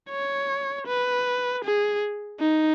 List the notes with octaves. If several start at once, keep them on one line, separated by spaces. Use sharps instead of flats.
C#5
B4
G#4
D#4